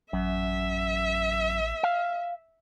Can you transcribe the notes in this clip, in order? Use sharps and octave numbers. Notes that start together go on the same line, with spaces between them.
A1 F#2 E5
F5